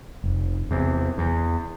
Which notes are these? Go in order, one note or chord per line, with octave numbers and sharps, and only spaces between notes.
F1
E2 C3
E2